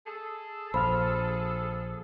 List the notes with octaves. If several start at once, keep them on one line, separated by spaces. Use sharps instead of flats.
G#4 A4
A#1 C5 F5 B5 F6